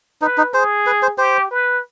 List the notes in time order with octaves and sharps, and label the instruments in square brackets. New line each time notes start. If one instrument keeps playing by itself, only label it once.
[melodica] D#4 [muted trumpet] B4
[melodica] D#4
[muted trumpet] G#4 [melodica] C5
[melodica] B4
C5
[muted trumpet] G4 [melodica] C5
[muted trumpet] B4